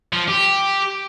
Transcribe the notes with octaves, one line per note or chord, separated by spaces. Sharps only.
F3
G4